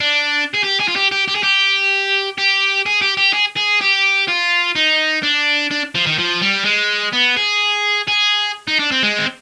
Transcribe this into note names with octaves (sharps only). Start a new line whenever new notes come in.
D4
G#4
G4
G#4
F4
G4
G4
G4
G#4
G4
G4
G#4
G4
G4
G#4
G#4
G4
F4
D#4
D4
D4
F3
D#3
F3
G3
G#3
B3
G#4
G#4
D#4
D4
C4
G#3
C4